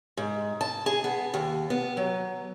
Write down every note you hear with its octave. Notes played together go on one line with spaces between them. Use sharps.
G#2
A5
G#4
B3
D#2
B3
F#3